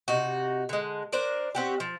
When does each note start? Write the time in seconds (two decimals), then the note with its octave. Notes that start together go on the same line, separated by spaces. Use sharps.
0.08 C3 D#4 F#4
0.69 D3 G#3
1.13 D4 A#4 C5 D5
1.55 C4 F#4 G4
1.80 F3